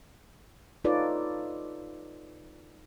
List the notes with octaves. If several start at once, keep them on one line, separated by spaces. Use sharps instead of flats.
D#4 F4 A4 B4 C#5 D5